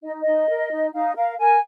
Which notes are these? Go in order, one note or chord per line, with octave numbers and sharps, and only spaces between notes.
D#4 D#5
D#5
D#4
A#4
D#4
D#4 F5
A#4 F5
A#4 G#5